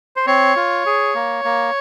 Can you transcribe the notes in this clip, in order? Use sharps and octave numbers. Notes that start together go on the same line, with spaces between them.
C5
C4 C#5
F4
G#4
A#3
A#3